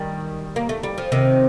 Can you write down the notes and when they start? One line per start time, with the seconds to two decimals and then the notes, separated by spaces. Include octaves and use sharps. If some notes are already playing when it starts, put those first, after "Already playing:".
Already playing: D#3 G3
0.56 A#3
0.69 A3
0.83 G3
0.98 F3
1.12 C3 D#3